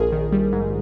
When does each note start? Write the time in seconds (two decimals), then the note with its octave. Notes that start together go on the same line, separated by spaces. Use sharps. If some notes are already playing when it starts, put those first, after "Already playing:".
Already playing: A#1 G#4 A#4
0.12 D#3
0.32 G3
0.53 G#2